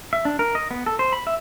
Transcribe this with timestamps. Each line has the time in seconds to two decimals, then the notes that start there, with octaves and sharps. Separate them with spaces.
0.13 E5
0.25 D4
0.39 A#4
0.55 D#5
0.71 B3
0.86 A4
0.99 C5
1.13 B5
1.27 E5